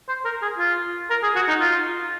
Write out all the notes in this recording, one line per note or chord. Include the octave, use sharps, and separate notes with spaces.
C5
A#4
G#4
F4
A#4
G#4
F#4
D#4
F4